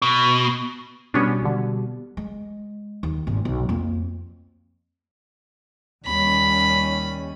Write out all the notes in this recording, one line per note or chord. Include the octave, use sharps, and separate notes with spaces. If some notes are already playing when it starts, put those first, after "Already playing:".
B2
B2 G3 B3 C#4 D4
G#1 D3
G#3
D#2
G#1 A#2
B1
F2 A#3
D#2 G3 C#4 B5